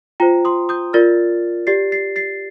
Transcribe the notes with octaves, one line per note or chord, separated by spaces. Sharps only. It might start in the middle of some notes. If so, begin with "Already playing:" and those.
F4 C5 G5 A#5
C6 D#6
D#6 G6
F4 A#4 D5 F6 A6
G4 D5 A6 C7
A6 C7
A6 C7